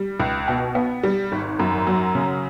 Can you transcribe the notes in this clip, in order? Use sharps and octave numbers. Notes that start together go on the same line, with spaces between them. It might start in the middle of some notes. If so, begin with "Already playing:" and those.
Already playing: G3
C#2
B2
B3
G3
G#1
F#2
F#3
C#3